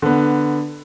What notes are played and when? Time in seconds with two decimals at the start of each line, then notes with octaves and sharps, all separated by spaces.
0.02 D3 B3